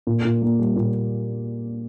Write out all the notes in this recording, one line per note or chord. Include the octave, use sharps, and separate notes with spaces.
A#2
A#2
A#3
G3
A#2